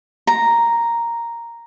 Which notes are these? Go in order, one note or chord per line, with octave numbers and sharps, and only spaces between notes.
A#5